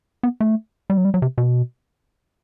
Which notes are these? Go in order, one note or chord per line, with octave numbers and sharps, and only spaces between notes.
B3
A3
G3
F#3
G3
F#3
C3
B2